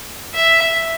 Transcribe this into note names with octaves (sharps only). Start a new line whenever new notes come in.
E5